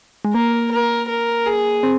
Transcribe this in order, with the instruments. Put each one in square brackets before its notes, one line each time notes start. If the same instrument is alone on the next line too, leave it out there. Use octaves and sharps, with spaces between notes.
[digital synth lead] G#3
[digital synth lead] A#3 [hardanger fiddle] A#4
[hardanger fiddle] A#4
A#4
G#4
[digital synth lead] C4